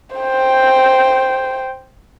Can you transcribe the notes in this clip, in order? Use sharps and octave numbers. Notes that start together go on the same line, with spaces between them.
C5 G5